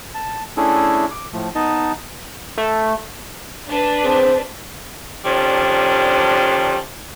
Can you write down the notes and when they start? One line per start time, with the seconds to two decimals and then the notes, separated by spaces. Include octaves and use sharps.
0.14 A5
0.57 A3 C#4 D4 E4 G#4 A4
1.11 D6
1.33 A2 F3 A3
1.55 B3 D#4 D#5 A5
2.58 A3
3.69 D4 B4
4.04 C4 G#4 C5
5.24 D3 D#3 F3 G3 C#4 D4